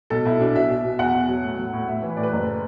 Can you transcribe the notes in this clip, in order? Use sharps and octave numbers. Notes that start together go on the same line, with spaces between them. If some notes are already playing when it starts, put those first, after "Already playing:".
B1 A4
B1 E4
B2 D4
B2 E5
B2
B2
E2 F#5
E2
F#3
A2
F#3
A2
A2 E5
E3
B4
A2 D5
B4
F#1